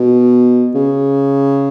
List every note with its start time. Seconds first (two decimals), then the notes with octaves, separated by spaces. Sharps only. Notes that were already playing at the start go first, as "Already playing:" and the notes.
Already playing: B2
0.75 C#3